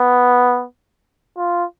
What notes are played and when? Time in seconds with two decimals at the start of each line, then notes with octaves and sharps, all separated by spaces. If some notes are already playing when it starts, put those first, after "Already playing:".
Already playing: B3
1.38 F4